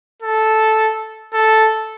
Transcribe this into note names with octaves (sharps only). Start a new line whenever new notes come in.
A4
A4